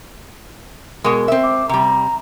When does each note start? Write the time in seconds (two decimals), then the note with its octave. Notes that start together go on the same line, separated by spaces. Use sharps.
1.04 B2 G#3 A#4
1.28 C4 E5
1.43 D6
1.69 C3 G3 A#5